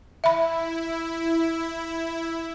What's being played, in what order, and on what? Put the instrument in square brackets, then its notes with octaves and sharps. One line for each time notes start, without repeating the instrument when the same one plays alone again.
[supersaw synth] E4 [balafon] E5 B5